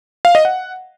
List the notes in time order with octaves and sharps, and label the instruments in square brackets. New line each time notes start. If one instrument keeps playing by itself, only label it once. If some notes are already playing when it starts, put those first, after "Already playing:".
[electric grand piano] F5
D#5
F#5